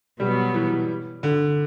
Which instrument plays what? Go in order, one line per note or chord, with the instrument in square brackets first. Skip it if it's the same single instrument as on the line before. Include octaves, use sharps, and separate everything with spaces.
[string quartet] B2 F#3 B3 [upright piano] G3
[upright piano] E3
D3